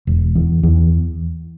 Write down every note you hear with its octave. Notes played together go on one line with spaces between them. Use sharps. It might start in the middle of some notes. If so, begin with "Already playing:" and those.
E1
E2
E2